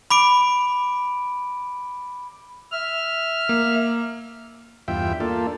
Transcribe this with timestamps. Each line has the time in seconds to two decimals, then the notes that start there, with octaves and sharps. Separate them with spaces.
0.11 B5 D6 D7
2.72 E5 F6
3.49 A#3
4.88 E2 G2 F4 E5 G5
5.20 A#3 D4 F4 A4